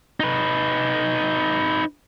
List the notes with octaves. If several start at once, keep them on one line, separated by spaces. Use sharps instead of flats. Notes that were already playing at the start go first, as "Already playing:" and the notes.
D#4 B4